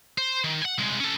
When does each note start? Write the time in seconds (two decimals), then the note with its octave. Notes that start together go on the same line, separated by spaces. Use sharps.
0.18 C5
0.44 D#3
0.62 F#5 G#5
0.78 C2 G#3
1.00 C#4 A4